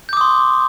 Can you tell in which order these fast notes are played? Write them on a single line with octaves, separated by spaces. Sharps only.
G6 D6 D#6 C6